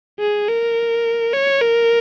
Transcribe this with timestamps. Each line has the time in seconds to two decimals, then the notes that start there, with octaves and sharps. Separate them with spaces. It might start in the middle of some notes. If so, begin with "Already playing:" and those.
0.19 G#4
0.49 A#4
1.33 C#5
1.62 A#4